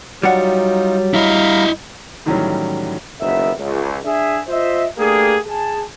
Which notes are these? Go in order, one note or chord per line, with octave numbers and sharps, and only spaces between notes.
F#3 G3 D#4 F4 F#5
E4 D#5 F5 A#5 B5
A2 D#3 E3 F#3 G3 C#4
F#1 F2 D#3 B3 E5
C#2
D4 G#4 E5
F4 C5 D#5 E5
A3 A#3 D4 G4 G#4
G#4 A5